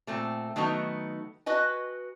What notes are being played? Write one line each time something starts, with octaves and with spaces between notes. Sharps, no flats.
A#2 A3 C4
D#3 F#3 A3 B3 D#4
F#4 B4 D#5 G#5